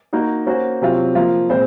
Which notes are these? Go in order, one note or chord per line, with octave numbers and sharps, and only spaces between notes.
A#3 D#4 F#4
A#3 C#4 F#4 C5
C3 F#3 C4 F4
F3 A#3 F4
A#2 G#3 C4 F4 C5